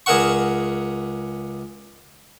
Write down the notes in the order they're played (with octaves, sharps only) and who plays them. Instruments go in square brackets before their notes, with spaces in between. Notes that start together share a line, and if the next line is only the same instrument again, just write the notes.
[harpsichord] C#2 G#4 A#4 E5 F#5 C#6